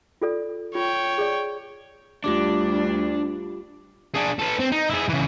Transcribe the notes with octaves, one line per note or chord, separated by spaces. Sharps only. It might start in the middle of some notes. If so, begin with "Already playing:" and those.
F4 A4 D5
F4 C#5 G5
G#4 D5
D2 G3 D4 F4 G4 D6
D4 G#4
A4 B4
C4
D#4
E4 G#4
C#3 E3